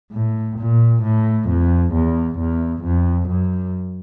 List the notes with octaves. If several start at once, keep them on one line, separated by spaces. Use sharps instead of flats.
A2
A#2
A2
F2
E2
E2
F2
F#2